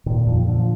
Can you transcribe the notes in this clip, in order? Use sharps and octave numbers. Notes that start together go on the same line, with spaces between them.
A#2 D#3
A#2
F2 F3
A#2
D3
F3